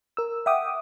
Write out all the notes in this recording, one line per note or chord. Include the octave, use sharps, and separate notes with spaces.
A#4 E6
E5 F#5 G5 D6 D#6